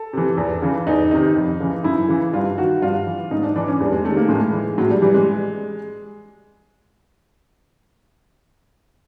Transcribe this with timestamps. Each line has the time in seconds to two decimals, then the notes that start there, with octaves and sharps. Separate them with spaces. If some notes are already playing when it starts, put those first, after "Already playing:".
Already playing: A4
0.13 C3 E3
0.37 E2
0.62 C#3 E3
0.87 E2 D#4
1.11 C3 D#3 D#4
1.36 F2
1.60 C#3 E3
1.84 F#2 E4
2.09 C#3 E3
2.33 G2 F4
2.58 D#3 F#4
2.82 G2 F4
3.07 E3
3.31 G#2 D#4
3.43 D4
3.56 E3 D4
3.68 C#4
3.80 E2 G3
3.92 G#3
4.04 C3 D#3 A3
4.17 A#3
4.29 A2 G#3
4.53 E3
4.78 A2 F#3
4.90 G3
5.02 E3 G3
5.14 G#3